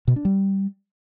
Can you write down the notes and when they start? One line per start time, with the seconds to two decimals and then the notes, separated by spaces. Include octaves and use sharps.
0.08 B2
0.16 D4
0.25 G3